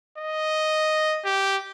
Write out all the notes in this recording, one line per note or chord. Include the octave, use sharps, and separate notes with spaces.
D#5
G4